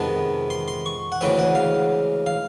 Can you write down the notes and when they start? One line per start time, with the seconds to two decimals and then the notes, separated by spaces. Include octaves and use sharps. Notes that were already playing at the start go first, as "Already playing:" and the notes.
Already playing: F2 C3 D#3 G#3 B3 A5
0.50 C6
0.68 C6
0.86 C#6
1.12 F#5
1.21 D2 C#3 E3 G#3 C4 G5
1.39 F#5
1.55 F5
2.26 F5